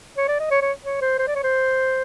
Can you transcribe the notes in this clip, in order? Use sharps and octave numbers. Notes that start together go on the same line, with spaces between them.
C#5
D5
D#5
C#5
C#5
C#5
C5
C5
D5
C#5
C5